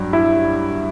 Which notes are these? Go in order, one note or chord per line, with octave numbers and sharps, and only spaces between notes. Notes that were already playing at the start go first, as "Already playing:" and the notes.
Already playing: G2 F#3
E4